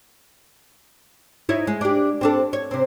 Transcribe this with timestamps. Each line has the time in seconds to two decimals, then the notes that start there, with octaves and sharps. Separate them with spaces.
1.49 D#4 E4 C#5
1.67 G#3
1.81 D4 G4
2.21 C4 D4 A4
2.53 C#5
2.71 C3 C4